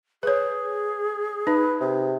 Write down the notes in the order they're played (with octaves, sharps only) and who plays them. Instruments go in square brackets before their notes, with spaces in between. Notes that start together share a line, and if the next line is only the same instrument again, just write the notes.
[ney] G#4 [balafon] B4 C#5
[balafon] D#4 [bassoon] B4
[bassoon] C3